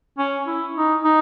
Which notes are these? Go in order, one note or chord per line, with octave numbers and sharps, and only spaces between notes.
C#4
E4
D#4
D#4